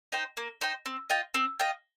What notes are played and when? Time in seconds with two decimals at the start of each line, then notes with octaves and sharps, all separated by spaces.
0.12 D#4 C5 G5
0.37 A#3
0.61 D#4 C5 G5
0.86 C4
1.10 F4 D#5 G5
1.34 C4
1.59 F4 D#5 G5